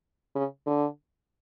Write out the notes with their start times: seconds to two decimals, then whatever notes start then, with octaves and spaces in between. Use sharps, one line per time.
0.35 C#3
0.66 D3